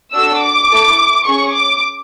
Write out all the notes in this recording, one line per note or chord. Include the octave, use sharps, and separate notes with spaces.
D4 F#4 A4 E6
D6
A3 E4 A4
C#4 G#4 C#6
D6